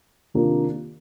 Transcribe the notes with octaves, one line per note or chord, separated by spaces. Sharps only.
C3 D#3 A#3 D4 F4